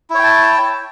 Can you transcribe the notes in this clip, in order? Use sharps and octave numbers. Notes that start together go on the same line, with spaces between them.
E4 C#5 G5 A5